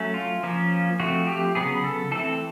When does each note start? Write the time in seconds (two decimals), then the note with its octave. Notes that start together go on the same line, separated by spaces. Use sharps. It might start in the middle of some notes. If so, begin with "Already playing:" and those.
Already playing: F#3 A3 C#4
0.14 F4
0.43 F3 A#3 C#4
1.00 F3 A3 C4 F#4
1.27 G4
1.55 C#3 F#3 B3 G#4
1.84 A4
2.11 E3 A3 C4 A4